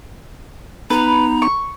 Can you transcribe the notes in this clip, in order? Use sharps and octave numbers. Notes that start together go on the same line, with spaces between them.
B3 D#4 B4 A#5
C#6